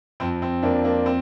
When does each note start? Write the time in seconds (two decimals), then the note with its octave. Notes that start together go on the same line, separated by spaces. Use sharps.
0.20 F2 C4
0.42 C4
0.62 F2 A#3 D4
0.84 A#3 D4
1.06 C4